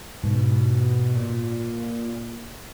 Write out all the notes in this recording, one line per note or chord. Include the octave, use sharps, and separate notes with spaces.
G#2 B2
A#2